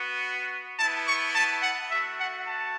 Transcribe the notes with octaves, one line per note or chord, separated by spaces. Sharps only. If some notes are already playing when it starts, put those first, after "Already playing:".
Already playing: B3 F#4
B3 E4 A5
C#6
A5
F#5
A3 F#4 E5
F#5
A5